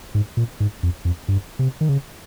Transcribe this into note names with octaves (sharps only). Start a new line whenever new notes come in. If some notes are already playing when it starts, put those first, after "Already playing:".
G#2
A#2
G#2
F2
F2
G2
C3
D#3
C#3